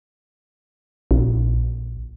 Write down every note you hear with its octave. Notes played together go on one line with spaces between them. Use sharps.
A#1